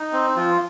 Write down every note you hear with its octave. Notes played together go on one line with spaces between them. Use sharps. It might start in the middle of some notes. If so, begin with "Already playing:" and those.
Already playing: D#4
C4
F3 F4